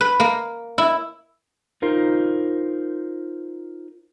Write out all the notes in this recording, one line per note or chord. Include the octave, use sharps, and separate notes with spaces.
B4
A#3
E4
D#4 F4 A#4 C5